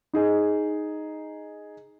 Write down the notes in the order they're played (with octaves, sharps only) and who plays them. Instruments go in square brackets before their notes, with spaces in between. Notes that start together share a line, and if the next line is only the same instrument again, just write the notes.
[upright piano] D#4 G#4 D#5